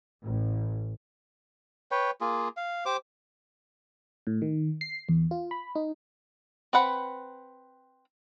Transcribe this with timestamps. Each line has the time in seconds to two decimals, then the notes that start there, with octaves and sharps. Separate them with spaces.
0.23 A1
1.91 B4 C#5 G5
2.21 A#3 F4 G#4
2.57 F5
2.86 G4 C5 D6
4.27 A2
4.42 D#3
4.81 C7
5.09 E2
5.31 F4
5.51 B5
5.75 D#4
6.73 C4 B4 F#5 B5